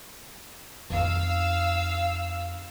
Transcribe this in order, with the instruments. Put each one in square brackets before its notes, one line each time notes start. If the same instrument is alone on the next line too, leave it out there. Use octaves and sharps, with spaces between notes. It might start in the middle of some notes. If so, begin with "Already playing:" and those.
[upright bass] F2 D#4 [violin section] F5 E6